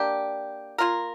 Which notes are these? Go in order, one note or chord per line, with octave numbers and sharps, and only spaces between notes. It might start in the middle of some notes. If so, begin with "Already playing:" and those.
Already playing: A#3 D4 G4
A#3 F4 A#4